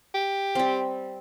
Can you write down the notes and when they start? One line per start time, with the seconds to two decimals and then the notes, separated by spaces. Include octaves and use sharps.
0.14 G4
0.55 G3 C4